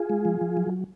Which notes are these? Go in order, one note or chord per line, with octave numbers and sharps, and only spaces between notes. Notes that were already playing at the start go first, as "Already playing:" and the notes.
Already playing: F4 G#4
G#3
F3
F3
F#3